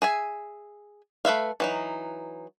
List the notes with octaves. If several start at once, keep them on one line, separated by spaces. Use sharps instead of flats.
G#4 E5 G#5
A3 B4 E5 F5
E3 F#3 D#4